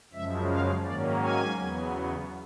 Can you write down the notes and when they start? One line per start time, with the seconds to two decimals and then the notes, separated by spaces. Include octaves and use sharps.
0.13 F#2 C#3 F3 G#3 E5
0.49 F5
0.85 G#2 D#3 F#3 A#3 C#4 D5
1.21 G#5
1.57 E2 C#3 F#3 B3